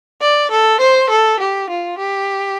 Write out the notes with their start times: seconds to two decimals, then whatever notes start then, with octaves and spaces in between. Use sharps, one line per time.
0.22 D5
0.51 A4
0.80 C5
1.10 A4
1.40 G4
1.70 F4
1.98 G4